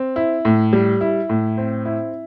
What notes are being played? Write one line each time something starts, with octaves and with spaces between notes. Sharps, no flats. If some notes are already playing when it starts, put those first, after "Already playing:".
Already playing: C4
E4
A2
G3
E4
A2
C4
E4